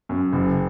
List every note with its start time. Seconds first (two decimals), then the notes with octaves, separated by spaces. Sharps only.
0.09 F#2
0.33 F#1